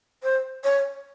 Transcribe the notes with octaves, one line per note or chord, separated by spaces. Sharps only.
C5
C#5